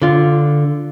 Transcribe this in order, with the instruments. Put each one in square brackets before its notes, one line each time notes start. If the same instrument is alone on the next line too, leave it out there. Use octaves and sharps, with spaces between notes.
[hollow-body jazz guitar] D3 F4